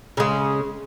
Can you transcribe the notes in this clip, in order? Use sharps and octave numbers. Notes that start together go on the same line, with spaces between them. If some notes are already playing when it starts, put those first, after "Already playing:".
C#3 G#3